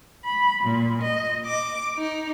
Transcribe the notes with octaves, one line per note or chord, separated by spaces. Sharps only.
B5
A#2
D#5
D6
D#4